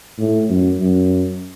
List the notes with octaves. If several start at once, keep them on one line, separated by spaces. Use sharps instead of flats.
A2
F#2
F#2